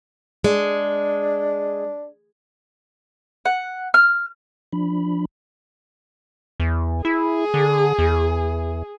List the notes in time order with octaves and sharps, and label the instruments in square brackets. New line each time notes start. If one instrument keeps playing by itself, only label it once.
[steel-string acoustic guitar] G#3 [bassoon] D4
[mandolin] F#5
F6
[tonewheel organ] F3 D4 B5
[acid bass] E2
[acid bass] E4 [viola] G#4
[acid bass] D3
E2